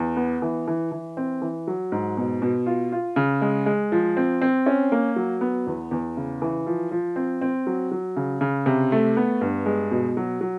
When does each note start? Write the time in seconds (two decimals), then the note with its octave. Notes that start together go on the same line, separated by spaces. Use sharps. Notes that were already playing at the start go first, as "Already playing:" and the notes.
Already playing: E2
0.16 B3
0.42 E3
0.68 E3
0.92 E3
1.17 C4
1.42 E3
1.67 F#3
1.92 G#2
2.17 B2
2.42 B2
2.66 F4
2.92 F4
3.16 C#3
3.41 G#3
3.66 G#3
3.92 F3
4.17 C4
4.41 C4
4.66 C#4
4.92 A#3
5.16 F#3
5.41 B3
5.67 E2
5.91 E2
6.17 C#3
6.42 E3
6.67 F3
6.91 F3
7.16 C4
7.41 C4
7.67 F#3
7.91 F#3
8.16 C#3
8.41 C#3
8.66 C3
8.92 A3
9.17 B3
9.41 G2
9.66 G#3
9.91 B2
10.17 F#3
10.41 F#3